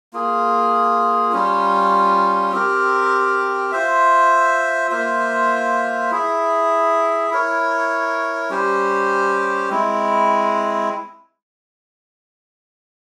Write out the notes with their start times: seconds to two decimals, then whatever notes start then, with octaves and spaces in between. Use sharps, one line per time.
0.13 A#3 F4 G#4
1.32 G3 C#4 F4
2.52 C4 G4 A#4
3.72 F4 C5 E5
4.91 A#3 F4 C5 E5
6.11 E4 G#4 E5
7.31 E4 A#4 C#5
8.50 G3 C#4 G4 C5
9.70 G#3 C4 E4